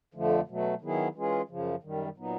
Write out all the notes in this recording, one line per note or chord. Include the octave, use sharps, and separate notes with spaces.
F2 D3 F3 A3
B2 F#3 A3
D#3 F#3 B3 E4 G#4
E3 G#3 C#4 F4 G#4
F#2 C#3 F3
F#2 D#3 G3
A#2 F#3 B3 D#4